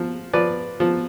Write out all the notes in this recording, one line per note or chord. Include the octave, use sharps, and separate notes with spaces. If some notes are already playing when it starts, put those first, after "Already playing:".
Already playing: F3
F3 B4 D5
F3